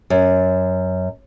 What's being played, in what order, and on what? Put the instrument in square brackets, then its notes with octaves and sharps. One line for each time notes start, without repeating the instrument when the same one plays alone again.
[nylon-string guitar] F#2